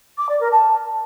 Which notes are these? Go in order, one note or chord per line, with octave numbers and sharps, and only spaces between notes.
D6
D5
A#4
A5